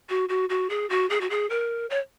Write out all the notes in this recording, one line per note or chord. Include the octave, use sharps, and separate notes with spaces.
F#4
F#4
F#4
G#4
F#4
G#4
F#4
G#4
A#4
C#5